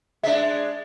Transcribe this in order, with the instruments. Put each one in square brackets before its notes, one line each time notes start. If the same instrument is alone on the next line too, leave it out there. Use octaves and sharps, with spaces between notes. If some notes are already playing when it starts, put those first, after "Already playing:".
[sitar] G#3 D4 [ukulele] E5